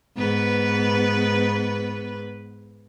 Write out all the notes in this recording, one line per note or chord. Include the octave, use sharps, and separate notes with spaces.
G#2 B3 B4